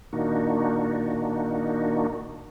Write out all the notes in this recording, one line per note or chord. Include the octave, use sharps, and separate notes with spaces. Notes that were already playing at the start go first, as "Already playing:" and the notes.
A#2 D#3 A#3 D4 D#4 F#4